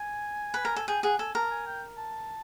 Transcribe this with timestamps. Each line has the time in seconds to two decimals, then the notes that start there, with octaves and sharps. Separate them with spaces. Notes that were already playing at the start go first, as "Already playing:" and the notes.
Already playing: G#5
0.54 B4
0.65 A#4
0.76 A4
0.88 G#4 G5
1.03 G#4 F#5
1.19 A4 G#5
1.35 A#4 A5
1.51 G#5
1.66 G5
1.97 A5